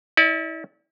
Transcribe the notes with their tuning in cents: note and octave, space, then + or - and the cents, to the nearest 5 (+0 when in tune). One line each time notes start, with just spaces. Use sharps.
E4 -35 D5 +0